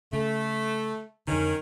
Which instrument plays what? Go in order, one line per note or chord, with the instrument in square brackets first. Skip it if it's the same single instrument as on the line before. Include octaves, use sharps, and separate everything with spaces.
[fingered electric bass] C#3 [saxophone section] A3
[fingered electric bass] F2 D3 [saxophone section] D#3 C#4